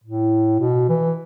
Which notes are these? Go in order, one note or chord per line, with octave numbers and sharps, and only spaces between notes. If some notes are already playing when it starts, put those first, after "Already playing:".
A2
B2
E3